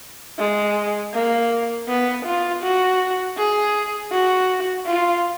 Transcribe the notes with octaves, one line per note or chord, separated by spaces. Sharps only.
G#3
A#3
B3
F4
F#4
G#4
F#4
F4